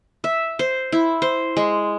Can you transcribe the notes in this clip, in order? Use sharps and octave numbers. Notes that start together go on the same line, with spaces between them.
E5
C5
E4
C5
G#3